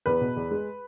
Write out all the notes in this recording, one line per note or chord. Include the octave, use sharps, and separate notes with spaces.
E2 B4
B2
E2
G#3